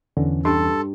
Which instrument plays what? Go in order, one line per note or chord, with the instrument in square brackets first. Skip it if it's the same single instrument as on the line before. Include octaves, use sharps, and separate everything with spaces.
[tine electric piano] E2 E3 C#4 [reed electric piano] D3
[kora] G2 [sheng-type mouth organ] A4 [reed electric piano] C6